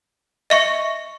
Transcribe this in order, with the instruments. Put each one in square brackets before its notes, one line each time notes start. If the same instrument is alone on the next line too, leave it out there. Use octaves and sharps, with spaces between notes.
[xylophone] D#5 E5 C#6 C#7